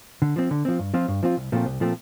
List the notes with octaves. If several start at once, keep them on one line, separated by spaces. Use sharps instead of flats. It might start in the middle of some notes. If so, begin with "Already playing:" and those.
D3
F3 C4
D3
F3 C4
G2
F3 C4 F4
G2
F3 C4 F4
C2
A#2 F3 A3 C4
C2
A#2 F3 A3 C4